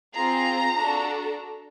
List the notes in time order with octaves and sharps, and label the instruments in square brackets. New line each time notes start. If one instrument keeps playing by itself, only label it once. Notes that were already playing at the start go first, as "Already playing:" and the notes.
[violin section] C4 F4 G#4 A#5
D4 F#4 A4